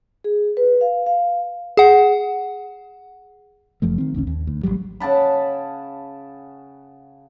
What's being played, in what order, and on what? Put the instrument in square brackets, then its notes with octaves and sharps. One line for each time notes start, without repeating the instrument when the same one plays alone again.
[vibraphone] G#4
B4
F5
F5
[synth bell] G#4 F#5
[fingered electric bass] F#1 F#2 F3 A3
D#3 C4
A1 D#2 D3 C#4
D#2
D2
A1 C3 F#3 G3
[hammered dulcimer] C#3 F#5 A5 B5